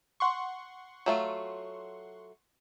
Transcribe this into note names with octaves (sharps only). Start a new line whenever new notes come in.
F#5 C6 C#6
F#3 A3 F4